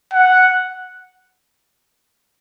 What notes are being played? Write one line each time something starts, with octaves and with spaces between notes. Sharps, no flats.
F#5